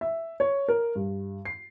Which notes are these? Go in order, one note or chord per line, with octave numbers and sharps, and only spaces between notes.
E5
C#5
A#4
G2
C7